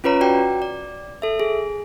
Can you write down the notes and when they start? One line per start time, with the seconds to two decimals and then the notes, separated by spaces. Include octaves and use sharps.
0.04 C#4 F4 B4 C#5 A#5
0.21 F#4 D5 G5
0.62 D5
1.22 A4 E5
1.40 G#4